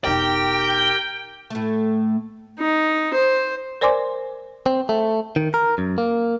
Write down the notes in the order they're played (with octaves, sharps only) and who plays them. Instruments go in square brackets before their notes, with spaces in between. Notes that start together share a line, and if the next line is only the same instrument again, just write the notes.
[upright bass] E1 D#4 [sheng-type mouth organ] G4 A#4 [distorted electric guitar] G5
[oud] A2 A3
[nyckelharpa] D#4
C5
[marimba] A#4 C5 D5 G#5 C6 D6
[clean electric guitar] C4
A3
D#3
A#4
F#2
A#3